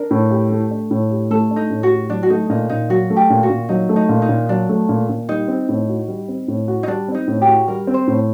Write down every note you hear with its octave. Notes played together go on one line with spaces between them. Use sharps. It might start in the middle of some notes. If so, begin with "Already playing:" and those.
Already playing: D4 A#4
A2
G4
A3
D4
A2
G4
A3 A4
D4
D#4
A2
F#4
G4
F#3 D4
F#4
A3 D#4
A#2 D#4
A#2 D#4
F#3 F#4
A3
G4
A#2
F#4
A#2
F#3 D#4
A3
D#4
A#2
D#4
A#2
F#3 D4
A3
A#2
A#2
G3 D#4
C4
A2
F#4
G3
C4
A2
F#4
D#4
G3 D4
C4
D#4
A2
G4
F#4
G3 A#4
C4
C5
A2